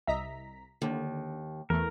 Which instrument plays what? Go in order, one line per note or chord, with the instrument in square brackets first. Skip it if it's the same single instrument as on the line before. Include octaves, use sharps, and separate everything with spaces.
[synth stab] C2 A#5 B6 [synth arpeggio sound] D#5 E5
[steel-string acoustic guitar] D#2 [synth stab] D3
[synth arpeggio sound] E2 [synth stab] E3 A3 [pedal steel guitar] A#4